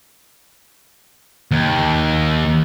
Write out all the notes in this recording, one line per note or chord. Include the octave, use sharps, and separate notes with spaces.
D#2